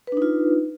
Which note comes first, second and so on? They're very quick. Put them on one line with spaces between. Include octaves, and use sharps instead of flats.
B4 D4 D#4 F4